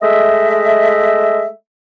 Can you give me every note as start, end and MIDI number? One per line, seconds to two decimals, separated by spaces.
0.02 1.48 56
0.02 1.48 57
0.02 1.48 75
0.02 1.48 76